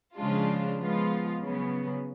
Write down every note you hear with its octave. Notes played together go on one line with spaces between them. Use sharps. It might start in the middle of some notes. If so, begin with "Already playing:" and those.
C#3 F3 G#3 D4 F4
F3 G#3 B3 F4
C#3 F#3 B3